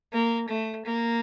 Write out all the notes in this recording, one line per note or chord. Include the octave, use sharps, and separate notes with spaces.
A#3
A3
A#3